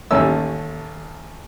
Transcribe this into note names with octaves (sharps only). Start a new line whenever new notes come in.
A1 D#2 A3 C#4 E6